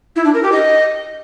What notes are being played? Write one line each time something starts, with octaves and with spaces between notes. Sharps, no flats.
E4
D4
A#4
G4
D#5